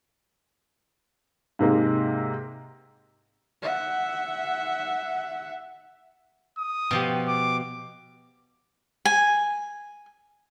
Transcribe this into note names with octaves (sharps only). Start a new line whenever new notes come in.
G#2 C3 G#3 A#3
E5 F#5
D#6
B2 F3 G4
D6
G#5